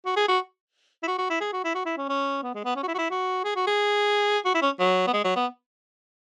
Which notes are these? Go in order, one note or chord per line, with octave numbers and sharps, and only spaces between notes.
F#4
G#4
F#4
E4
F#4
F#4
E4
G#4
F#4
E4
F#4
E4
C#4
C#4
B3
G#3
B3
C#4
F#4
E4
F#4
E4
F#4
G#4
F#4
G#4
F#4
E4
C#4
F#3
B3
G#3
F#3
B3